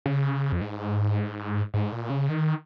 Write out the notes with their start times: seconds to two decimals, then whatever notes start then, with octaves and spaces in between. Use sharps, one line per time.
0.06 C#3
0.52 F2
0.61 G#2
1.74 G#2
1.92 A#2
2.10 C#3
2.29 D#3